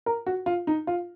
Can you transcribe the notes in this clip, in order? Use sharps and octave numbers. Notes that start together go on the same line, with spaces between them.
A#4
F#4
F4
D#4
F4